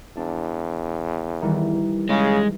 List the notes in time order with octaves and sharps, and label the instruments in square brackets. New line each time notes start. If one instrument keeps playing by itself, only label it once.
[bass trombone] E2 [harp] D4
[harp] D#3 E3 G3
[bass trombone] C#3 [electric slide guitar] G#3